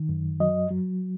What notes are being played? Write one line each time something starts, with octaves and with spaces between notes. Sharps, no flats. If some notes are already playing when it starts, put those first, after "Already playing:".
Already playing: D#3
F#2
F#3 D#5
F#3